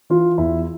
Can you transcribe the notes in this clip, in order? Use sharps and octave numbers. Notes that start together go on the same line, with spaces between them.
E3 F4
E2 E4